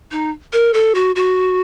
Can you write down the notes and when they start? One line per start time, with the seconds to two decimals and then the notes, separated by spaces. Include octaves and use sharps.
0.11 D#4
0.53 A#4
0.74 A4
0.95 F#4
1.16 F#4